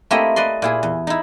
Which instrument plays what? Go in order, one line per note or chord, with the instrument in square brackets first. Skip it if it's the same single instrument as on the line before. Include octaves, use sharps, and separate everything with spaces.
[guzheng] A3 A#3 C4 E4 G4 D#5
B4 D5 D#5 C6
A#2 E4 G#4
E2
D#4 E4